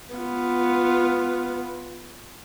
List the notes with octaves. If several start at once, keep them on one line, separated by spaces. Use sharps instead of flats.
B3 F4